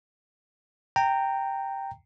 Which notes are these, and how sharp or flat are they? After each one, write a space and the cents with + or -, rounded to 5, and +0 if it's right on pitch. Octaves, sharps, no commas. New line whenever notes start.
G5 +0 A#5 -20